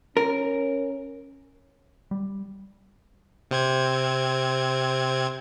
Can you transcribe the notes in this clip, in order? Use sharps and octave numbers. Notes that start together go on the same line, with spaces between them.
C#4 A#4
G3
C3 C4 G#6